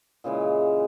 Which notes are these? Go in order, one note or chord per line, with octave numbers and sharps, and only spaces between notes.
A#2 C#3 E3 G#3